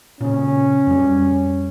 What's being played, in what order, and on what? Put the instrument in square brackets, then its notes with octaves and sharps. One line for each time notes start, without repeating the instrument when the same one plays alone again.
[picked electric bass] A#2 C#3 [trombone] C#4
[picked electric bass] F2 G3